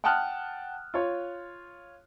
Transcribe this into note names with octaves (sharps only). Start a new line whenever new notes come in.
F#5 G5 A5 D#6 F6 F#6
F4 C#5